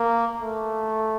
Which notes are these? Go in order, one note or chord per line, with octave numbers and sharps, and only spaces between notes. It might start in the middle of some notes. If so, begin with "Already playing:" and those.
Already playing: A#3
A3